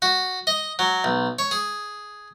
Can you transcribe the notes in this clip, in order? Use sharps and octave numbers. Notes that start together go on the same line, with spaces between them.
F#4
D#5
F#3
B1
C#5
G#4